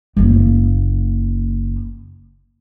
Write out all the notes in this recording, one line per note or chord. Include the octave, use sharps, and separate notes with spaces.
F#1 A#3